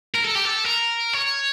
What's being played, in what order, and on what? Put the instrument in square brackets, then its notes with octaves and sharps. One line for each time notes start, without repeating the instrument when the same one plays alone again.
[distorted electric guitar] A#4
A4
G4
A4
A#4
C#5